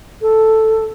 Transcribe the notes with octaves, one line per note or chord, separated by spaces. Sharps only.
A4